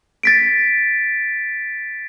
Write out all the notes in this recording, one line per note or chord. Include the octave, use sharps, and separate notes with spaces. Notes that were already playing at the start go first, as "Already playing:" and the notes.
A6 B6 D7